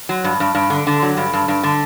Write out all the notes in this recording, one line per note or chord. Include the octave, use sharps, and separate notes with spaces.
F#3
G2
G2
G2
D3
D3
F#3
G2
G2
G2
D3